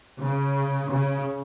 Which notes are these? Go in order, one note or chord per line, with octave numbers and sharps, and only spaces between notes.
C#3
C#3